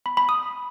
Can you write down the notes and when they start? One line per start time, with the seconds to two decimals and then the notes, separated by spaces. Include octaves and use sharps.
0.06 B5
0.17 B5
0.29 D#6